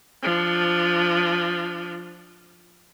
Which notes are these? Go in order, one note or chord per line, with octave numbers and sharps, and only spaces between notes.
F3 D4